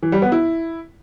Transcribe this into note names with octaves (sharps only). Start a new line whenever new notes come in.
E3
G3
B3
E4